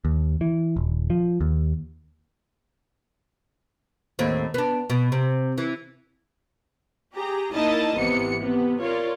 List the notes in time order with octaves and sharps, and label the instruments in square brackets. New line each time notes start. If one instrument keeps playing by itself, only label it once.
[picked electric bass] D#2
E3
D#1
F3
D#2
[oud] D#2 A2 C4
B3 D4
B2
C3
E3
[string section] G4 G#4 A#5
A#3 D#4 E4 A#4 D#5 A5
G#1 C3 E3 B3 C#7
C3 B3
F4 A#4 C#5 D5